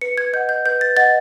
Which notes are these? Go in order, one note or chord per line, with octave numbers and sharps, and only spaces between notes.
B4 C#7
G#6
D#5 F#5 G6
G6
B4 G6
A6
D#5 F#5 A6